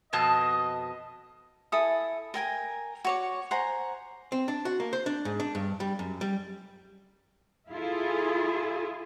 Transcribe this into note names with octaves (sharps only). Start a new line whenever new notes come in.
F2 B2 D#5 A5
E4 A4 G#5 D#6
A#4 G5 G#5 A#5
F#4 C#5 D6
C5 F#5 G#5 A#5
C4
D4
F#4
A#3
C5
D4
G#2
D4
G2
G3
F#2
G3
E4 F4 G#4 A4